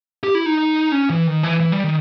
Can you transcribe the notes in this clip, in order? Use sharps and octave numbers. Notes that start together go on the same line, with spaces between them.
G4
E4
D#4
C#4
E3
D#3
E3
E3
G3
D#3